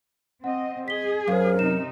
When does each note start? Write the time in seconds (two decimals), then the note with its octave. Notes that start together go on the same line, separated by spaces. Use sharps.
0.44 C4 D#5 F#5
0.88 G#4 D#5 B6 G7
1.28 F#2 A#4 C5 F5
1.59 C3 D#4 E7